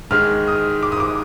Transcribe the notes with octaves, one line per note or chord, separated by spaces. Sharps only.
G#2 D#3 G#3 F6
D#6
D6
D#6
D6